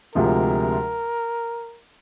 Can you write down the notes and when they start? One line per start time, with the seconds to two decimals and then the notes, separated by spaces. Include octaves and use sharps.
0.15 D2 C3 F3 G#3 A#4